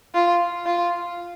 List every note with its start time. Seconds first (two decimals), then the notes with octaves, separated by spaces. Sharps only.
0.14 F4
0.66 F4